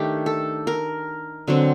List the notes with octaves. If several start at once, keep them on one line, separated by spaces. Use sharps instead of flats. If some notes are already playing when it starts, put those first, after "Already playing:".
Already playing: D#3 A3 D4 G4
A4
A#4
D3 F#3 C4